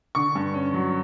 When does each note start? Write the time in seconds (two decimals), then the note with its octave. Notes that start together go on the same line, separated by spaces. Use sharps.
0.15 D3 C#6
0.35 G2
0.54 C#4
0.74 F#3